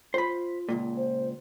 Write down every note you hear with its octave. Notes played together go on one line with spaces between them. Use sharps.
F4 C5 B5
C#2 F#2 A#2
C5